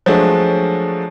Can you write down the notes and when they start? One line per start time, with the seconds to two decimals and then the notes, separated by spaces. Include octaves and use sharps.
0.06 F3 F#3 G#3 A3 D4